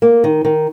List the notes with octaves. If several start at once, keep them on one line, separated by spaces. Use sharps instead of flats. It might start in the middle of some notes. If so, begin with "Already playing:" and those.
A#3
D#3
D#3